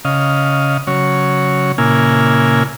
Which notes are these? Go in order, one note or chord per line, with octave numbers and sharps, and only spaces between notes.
C#3 D#5 F5
C#3 F#3 C#5
A#2 C#3 A#3 E4 G#5 F6